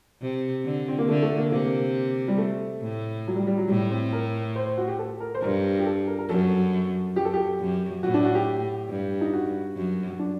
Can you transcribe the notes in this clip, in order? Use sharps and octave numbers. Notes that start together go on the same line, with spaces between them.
C3
D3
C4
A#3
D3 A3
A3
A#3
C3 A#3
G3
A3
A2
F#3
G3
G3
F#3
A2 G3
C4
A#4
C5
C5
F#4
G4
A4
A#4
C5
G2 A#4
G4
A4
A#4
A#4
F#2 A4
F#2 G4
A4
G4
F#2
A2 F#4
D4
F#4
G4
G2
D#4
F#4
F#2
D4